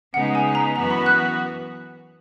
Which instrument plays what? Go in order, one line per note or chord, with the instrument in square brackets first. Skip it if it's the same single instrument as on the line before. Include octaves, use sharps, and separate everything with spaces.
[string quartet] C#3 G#3 B3 D#4 [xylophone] F#5
[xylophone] G#5
A#5
[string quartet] F#2 E3 B3 F#4 [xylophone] A#5
[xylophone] B5
F#6